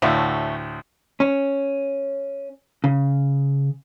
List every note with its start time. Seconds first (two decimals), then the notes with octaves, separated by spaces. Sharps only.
0.02 D2 A2 F#3 A3 F5
1.20 C#4
2.84 C#3